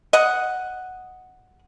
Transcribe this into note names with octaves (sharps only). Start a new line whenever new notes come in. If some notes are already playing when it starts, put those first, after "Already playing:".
D#5 F#5